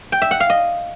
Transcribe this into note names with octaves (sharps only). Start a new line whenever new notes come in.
G5
E5
F#5
F5
D#5